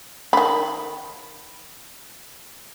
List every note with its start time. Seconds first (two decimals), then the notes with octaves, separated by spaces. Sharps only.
0.33 D3 D#3 B5